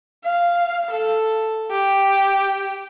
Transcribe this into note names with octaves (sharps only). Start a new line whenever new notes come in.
F5
A4
G4